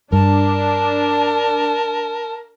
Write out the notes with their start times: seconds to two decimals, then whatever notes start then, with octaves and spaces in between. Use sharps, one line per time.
0.13 G2 D4 A#4 A5